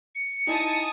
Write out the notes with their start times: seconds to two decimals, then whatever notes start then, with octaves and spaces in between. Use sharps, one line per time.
0.15 C#7
0.47 D#4 E4 G#5 A5 D#6